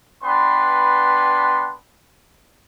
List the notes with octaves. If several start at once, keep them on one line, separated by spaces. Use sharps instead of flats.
B3 D4 B4 G5 C6